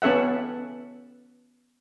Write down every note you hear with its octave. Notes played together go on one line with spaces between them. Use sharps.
B3 C#4 A4 E5 F#5